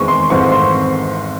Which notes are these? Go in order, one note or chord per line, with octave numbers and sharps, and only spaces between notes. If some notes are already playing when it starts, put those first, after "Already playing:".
Already playing: E2 D#3 G#3 C4 C#6
C6
G#1 G#2 E3 A3 C4 C#6
C6